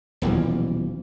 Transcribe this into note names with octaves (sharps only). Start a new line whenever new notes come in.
D#1 B1 E3 F3